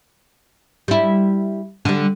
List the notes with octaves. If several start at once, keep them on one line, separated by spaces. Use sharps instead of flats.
G3 E4
D3 G3